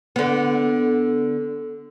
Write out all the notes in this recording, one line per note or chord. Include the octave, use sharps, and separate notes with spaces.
D3 B3